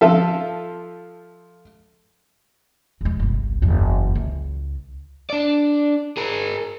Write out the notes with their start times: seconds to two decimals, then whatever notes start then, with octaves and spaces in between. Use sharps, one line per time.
0.01 F3 F4 A4 E5
3.01 E1 G#3
3.19 G1 C2
3.62 F#1 E2
4.15 C#2
5.30 D4 D5
6.17 G#4 A#4